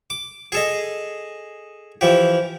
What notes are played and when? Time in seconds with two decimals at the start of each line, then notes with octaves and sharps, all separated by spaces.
0.10 D6
0.52 G#4 A4 D#5
2.01 E3 F3 G4